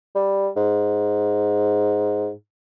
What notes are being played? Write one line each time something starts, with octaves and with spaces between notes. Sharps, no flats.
G3
G#2